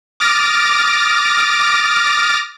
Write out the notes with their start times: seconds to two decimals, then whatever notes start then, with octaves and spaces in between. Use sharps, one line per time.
0.20 D6 D#6 F6 A6 A#6 D7